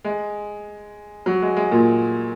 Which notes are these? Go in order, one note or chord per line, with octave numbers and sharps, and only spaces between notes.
G#3
F#3
G#3
G#3
A#2